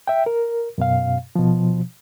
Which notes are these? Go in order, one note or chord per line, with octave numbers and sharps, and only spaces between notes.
E5 G5
A#4
F#2 B2 F5
B2 F3